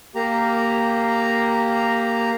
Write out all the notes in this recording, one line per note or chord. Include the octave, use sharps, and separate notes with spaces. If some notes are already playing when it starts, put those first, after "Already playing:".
A#3 G4 A#5